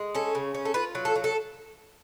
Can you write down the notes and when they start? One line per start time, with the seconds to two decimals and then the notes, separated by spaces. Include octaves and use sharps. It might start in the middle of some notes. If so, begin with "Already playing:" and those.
Already playing: G#3
0.15 C#4 A4
0.35 C#3
0.54 C#4
0.65 A4
0.74 F4 B4
0.95 F#3
1.05 A4
1.15 F#3
1.24 A4